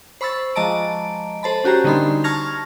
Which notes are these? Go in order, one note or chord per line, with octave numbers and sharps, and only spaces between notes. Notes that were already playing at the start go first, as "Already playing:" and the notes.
C5 B5 C#6 E6 A6
F3 G#3 D#5 A5 A#5 D7
A4 C5 A5 B5
C#4 F#4 G4 A#5
D3 G3 A#3 D#4 B5 C6
A5 C#6 F6 G#6 A#6 F7